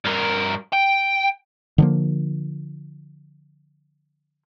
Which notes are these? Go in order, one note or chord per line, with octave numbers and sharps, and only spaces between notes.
G2 A#4
G5
D3 F3 A#3